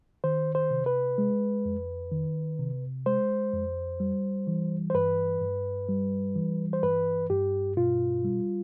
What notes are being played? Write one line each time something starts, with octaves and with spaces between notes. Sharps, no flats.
D#3 C5
C5
C3
B4
G#3
F2
D#3
C3
G#3 C5
F2
G3
E3
C5
G2 B4
G2
G3
E3
C5
G2 B4
G2 G4
B2 F4
G3